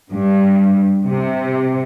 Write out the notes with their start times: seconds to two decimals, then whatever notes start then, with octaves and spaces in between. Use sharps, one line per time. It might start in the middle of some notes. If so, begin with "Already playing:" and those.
0.13 G2
1.05 C3